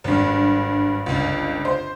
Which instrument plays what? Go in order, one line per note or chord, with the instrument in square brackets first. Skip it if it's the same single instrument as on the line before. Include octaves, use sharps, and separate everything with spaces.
[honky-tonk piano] G#1 G2
G1 C#2
C5